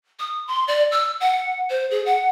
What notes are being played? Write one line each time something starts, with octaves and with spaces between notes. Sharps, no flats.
D#6
C6
D5
E6
F#5
C5
G#4
F#5